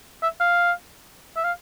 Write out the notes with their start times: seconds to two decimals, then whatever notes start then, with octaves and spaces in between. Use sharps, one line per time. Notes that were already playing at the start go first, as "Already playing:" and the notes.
0.23 E5
0.40 F5
1.37 E5
1.44 F5